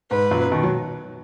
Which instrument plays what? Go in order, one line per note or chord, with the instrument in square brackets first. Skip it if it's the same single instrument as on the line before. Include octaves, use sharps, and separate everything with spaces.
[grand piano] G#2 [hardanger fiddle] B4
[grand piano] F#2 A#2
B2 D#3
F#3